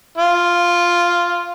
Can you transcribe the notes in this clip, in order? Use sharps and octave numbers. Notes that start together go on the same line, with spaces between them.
F4